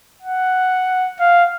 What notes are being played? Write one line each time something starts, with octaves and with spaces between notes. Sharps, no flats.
F#5
F5